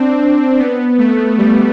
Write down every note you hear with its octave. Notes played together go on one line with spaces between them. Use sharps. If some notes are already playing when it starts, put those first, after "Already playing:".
Already playing: C4 D4
B3
A3
G3